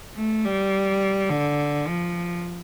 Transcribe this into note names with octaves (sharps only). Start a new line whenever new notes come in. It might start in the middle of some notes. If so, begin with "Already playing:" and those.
A3
G3
D3
F3